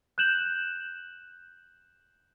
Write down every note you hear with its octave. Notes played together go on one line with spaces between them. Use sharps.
F#6 G6 E7 F#7